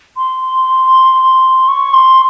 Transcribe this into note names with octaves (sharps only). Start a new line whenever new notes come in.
C6
C#6
C6